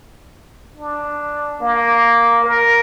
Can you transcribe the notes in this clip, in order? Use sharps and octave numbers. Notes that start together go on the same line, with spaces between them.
D4
A#3
A#4